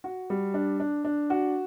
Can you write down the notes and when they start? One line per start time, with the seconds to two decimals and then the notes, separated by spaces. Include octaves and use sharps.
0.04 F#4
0.30 G3
0.54 D4
0.80 D4
1.04 D4
1.30 F#4